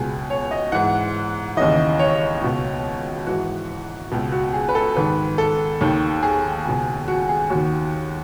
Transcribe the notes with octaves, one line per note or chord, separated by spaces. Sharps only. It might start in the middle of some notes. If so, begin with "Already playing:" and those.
Already playing: C#2 B2 G#4
C#5
D#5
G#2 E3 F#5
D#2 C#3 E3 D#5
C#5
C#2 B2
G#2 E3 F#4
C#2 B2
F#4
G#4
B4
A4
G#2 D#3 B4
A4
D#2 D#3
G#4
C#2 B2
F#4
G#4
D#2 D#3 F#4